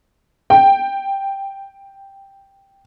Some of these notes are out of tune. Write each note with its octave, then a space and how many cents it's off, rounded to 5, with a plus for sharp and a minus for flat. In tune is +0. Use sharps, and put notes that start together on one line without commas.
G5 +0